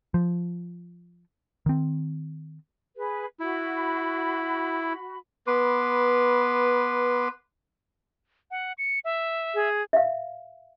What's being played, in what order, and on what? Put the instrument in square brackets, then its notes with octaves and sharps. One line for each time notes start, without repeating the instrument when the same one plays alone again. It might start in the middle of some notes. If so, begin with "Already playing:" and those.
[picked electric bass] F3
D#3 C4
[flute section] G#4 B4
[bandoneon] E4 [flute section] F#4 B5
[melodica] B3 B4 C6 D6
[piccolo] F#5
C#7
E5
[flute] G#4
[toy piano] E5 F5